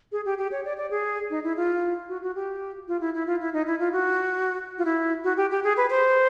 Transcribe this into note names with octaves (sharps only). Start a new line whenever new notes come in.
G#4
G4
G4
C#5
D5
D5
G#4
D#4
E4
F4
F#4
F#4
G4
F4
E4
E4
F4
E4
D#4
E4
F4
F#4
F4
E4
F#4
G4
G4
G#4
B4
C5